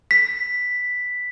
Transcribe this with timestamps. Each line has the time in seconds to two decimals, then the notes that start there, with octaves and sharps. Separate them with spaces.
0.11 B6